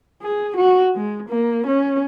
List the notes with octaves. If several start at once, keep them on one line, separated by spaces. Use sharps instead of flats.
G#4
F#4
G#3
A#3
C#4